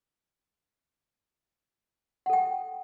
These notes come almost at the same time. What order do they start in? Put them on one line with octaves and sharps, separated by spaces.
F#5 A4 G5